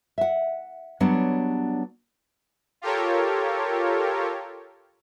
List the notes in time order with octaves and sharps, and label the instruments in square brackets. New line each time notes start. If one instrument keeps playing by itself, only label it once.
[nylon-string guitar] E5 F#5
F#3 G3 B3 D4 C#5
[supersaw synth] F4 G4 A4 A#4 C#5